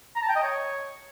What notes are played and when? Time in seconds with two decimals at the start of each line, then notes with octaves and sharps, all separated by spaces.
0.16 A#5
0.23 A5
0.29 G5
0.36 D#5
0.43 C#5